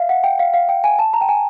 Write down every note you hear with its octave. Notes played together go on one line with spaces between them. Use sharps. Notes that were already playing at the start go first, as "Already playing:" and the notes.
Already playing: E5 F5
F#5
G5
F5
F5
G5
G#5
A5
A#5
G5
G#5